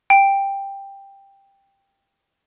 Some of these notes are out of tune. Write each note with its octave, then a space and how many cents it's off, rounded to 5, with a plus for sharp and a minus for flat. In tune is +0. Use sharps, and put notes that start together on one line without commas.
G5 +10